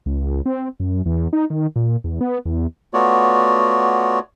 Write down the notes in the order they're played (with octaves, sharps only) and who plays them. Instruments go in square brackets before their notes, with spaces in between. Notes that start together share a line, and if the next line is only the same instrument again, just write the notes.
[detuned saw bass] C#2
C4
F#2
E2
D#4
D#3
A#2
E2
B3
E2
[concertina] A3 B3 F4 F#4 C#5 D5